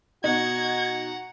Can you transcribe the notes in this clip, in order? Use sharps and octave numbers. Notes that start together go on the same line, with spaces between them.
B2 D#4 F#4 F#5 A#5 G#6